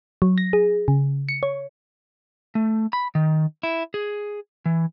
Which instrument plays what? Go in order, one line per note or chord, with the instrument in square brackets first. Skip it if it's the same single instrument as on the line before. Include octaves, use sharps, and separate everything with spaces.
[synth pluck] F#3
A#6
G#4
C#3
C#7
C#5
[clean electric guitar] A3
B5
D#3
E4
G#4
E3